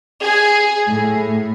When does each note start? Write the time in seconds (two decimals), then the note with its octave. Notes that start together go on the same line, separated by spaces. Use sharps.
0.23 G#4
0.88 A2